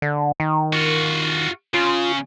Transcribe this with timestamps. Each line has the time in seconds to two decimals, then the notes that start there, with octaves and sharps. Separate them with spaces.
0.02 D3
0.40 D#3
0.73 F4 F#4
1.74 C#3 F4